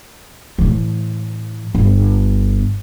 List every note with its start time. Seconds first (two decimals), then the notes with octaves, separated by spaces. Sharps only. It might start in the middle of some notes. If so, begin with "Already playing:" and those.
0.58 A2 E3
1.74 G1